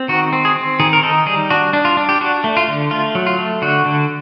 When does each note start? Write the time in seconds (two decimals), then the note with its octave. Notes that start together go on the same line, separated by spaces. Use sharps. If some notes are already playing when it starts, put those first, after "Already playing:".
Already playing: C4
0.08 D#3 F#4
0.33 C4
0.45 G#4
0.56 C4
0.80 D#3 G#4
0.93 A#4
1.03 D#4 A4
1.26 G3 G#4
1.50 D4 F#4
1.73 D4
1.85 F4
1.97 D4
2.09 G4
2.21 D4 F#4
2.44 A3
2.57 F4
2.68 D3
2.91 A3 F4
3.15 F#3
3.27 F4
3.38 A3
3.62 D3 F#4
3.86 D3